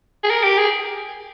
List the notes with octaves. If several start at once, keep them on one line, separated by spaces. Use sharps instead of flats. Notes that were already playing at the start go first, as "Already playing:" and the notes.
G#4
A#4
G4
G#4